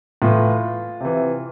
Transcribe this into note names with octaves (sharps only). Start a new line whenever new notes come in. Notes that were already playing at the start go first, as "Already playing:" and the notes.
A2 E3 F4
C3 E3